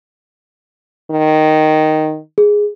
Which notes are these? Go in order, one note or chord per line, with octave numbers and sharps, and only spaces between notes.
D#3
G#4